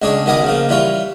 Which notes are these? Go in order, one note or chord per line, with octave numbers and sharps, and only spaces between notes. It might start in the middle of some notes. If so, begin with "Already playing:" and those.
C#2 G#3 D4 G#4 C#5
B1 D#3 B3 D#5 G#5 D6
C#3 F3 A#3
E3 G3 F4 C#5